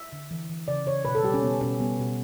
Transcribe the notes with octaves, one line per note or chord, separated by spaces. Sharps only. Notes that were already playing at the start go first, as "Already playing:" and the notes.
Already playing: E5
D3
E3
E3
C#3 D5
C#3 C#5
B2 B4
A4
G3 G4
C#4
B2 B3
B2 C#4
G3 B3
B2